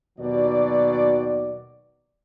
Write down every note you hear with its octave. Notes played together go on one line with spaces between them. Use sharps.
D#2 B2 D#3 F#3 D5